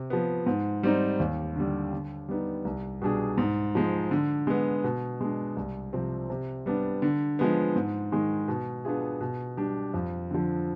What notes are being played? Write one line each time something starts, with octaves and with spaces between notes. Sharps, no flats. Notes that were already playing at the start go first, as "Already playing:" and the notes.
Already playing: C3
F3 B3
G#2
G3 C4 D#4
D#2
D3 G3
D3
G3 B3 D#4
C2
B2 G3 D4 G#4
G#2
F3 G#3
D3
G#3 B3
B2
G#3 B3 D4
C2
C3 F3 C4
C3
G3 B3 D4
D3
F3 G#3 B3
G#2
D#3 G#3
B2
B3 D4 F4 G#4
B2
G3 D4 G4
F2
D3 F3